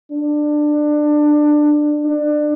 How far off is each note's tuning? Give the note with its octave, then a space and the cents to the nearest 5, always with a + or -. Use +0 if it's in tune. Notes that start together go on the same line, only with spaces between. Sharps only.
D4 +20
D4 +25